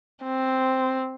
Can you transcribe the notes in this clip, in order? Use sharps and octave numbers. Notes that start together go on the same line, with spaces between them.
C4